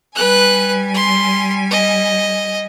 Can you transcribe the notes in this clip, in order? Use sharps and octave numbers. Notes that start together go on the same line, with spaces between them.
G3 B4 G#5 F#6
C6
D#5